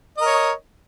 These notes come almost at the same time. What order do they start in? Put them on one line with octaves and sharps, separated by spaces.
D#5 A#4 C#5